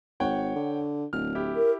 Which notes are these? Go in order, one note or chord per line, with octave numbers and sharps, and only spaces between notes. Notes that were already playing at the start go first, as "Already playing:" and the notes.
G#1 C#5 F#5 G5
D3
D1 F6
E4 G4
A#4